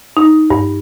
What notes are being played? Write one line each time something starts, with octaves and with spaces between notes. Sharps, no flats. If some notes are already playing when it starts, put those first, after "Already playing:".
D#4
G2